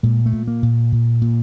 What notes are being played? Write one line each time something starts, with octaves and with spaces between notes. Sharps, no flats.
A#2 G#3
A3
A#2
A#3
A#2
A#2
A#2